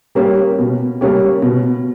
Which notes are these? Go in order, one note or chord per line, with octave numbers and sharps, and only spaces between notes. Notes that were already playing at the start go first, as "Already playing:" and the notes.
G3 A#3 C#4 G4
B2
G3 A#3 C#4 G4
B2